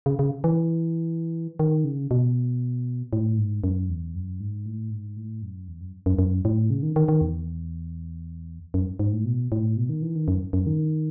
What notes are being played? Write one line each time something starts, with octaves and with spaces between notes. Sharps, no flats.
C#3
C#3
E3
D#3
C#3
B2
A2
G#2
F#2
E2
F#2
G#2
A2
G#2
A2
F#2
E2
F#2
F#2
F#2
A2
C#3
D#3
D#3
D#3
E2
F#2
G#2
A2
B2
A2
B2
D#3
E3
D#3
F#2
F#2
D#3